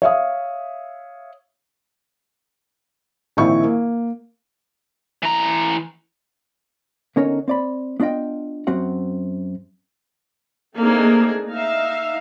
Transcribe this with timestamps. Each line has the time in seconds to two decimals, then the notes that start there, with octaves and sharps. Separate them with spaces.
0.02 C#5 E5 F5 D#6
3.37 A#1 D#3 C4 E4 C#6
3.64 A#3
5.23 E3 A#5
7.16 D3 B3 C#4 D#4 A#4 C#5
7.48 C4 D5 B5
8.00 B3 D4 F4 D#5 G5
8.67 F#2 C4 F#4 F#5
10.78 A3 A#3 C4 D4 D#4 G#4
11.49 D#4 E5 F5